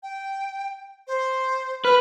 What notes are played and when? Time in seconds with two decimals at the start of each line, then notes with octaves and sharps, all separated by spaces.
0.03 G5
1.07 C5
1.85 B4 F6